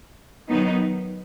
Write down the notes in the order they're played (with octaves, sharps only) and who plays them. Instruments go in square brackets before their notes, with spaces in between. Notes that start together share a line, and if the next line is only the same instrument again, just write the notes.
[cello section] D#3 F#3 B3 D#4